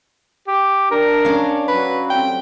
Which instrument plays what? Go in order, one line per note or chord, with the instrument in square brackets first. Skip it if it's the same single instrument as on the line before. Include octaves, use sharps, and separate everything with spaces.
[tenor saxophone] G4
[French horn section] D4 [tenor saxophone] A#4
[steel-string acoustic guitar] C#4 D5 F5
[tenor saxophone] F#3 [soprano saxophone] B4
[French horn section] A2 G3 C4 [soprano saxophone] G5